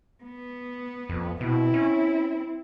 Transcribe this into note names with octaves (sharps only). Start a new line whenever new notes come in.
B3
F2
B2 C4 E4
C#4